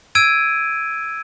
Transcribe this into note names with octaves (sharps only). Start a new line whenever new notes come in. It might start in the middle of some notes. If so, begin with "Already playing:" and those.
E6 G#6 D7 D#7